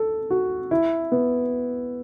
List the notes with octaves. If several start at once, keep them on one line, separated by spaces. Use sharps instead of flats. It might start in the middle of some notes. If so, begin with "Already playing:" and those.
Already playing: A4
F#4
E4
B3